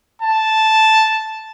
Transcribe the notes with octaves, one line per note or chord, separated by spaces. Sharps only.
A5